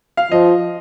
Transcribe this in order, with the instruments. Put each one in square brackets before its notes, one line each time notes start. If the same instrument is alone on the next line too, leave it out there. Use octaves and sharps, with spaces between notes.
[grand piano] F5
[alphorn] F3 [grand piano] D#5